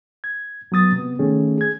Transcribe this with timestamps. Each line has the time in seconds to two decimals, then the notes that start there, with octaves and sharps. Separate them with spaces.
0.24 G#6
0.72 F#3 B3 D#6 A6
0.92 C3 B3
1.19 D#3 A3 C#4 G#4
1.58 G#4 G#6